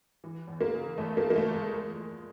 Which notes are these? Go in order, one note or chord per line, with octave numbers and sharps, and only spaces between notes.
E3
E2
A#3
C#3
E2 A3
A#3
E3
A#3
A3
E2
G#3
F3